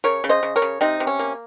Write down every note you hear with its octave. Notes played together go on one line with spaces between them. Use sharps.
C#3 A#4 C#5
C#3
C5 D#5
C#3
A#4 C#5
C#3
C3 C4 D#4
C3
C#4
A#3